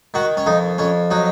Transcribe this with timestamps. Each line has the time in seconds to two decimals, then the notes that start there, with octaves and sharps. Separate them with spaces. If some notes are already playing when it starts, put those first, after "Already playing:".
0.14 D#3 F#4
0.37 C#4
0.46 F2 D#4
0.78 F2 C#4
1.11 F#3 D#4